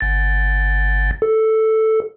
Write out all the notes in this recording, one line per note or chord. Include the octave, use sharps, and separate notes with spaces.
G1 A6
A4